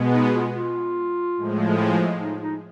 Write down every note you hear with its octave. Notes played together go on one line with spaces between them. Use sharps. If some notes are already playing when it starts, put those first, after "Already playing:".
Already playing: B2 G#3 B3
D#4
F4
F4
A2 F3 G#3
D#4
D#4